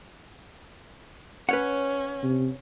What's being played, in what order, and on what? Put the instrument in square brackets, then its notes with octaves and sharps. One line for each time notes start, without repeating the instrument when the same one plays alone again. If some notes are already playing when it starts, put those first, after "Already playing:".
[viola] C#4 [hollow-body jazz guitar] B4 C#5 F#5
[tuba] C3